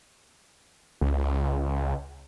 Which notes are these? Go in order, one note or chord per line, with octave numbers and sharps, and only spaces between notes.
C#2